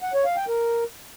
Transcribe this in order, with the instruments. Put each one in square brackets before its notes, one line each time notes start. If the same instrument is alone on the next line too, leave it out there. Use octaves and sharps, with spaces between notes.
[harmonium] F#5
C#5
F5
G5
A#4